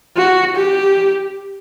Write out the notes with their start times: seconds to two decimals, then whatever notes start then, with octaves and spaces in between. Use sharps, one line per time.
0.16 F#4
0.55 G4